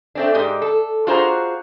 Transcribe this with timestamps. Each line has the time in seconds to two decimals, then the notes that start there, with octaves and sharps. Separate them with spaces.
0.15 A3 C4 D4
0.34 G#2 G#3 G4 D5
0.62 A4
1.07 D4 F4 F#4 G#4 C5 A#5